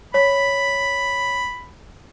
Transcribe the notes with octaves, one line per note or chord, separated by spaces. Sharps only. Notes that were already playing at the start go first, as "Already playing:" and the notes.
C#5 B5 B6